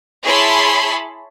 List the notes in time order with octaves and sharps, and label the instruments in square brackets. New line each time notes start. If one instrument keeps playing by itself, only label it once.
[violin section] E4 G#4 C#5 A5 B5 C6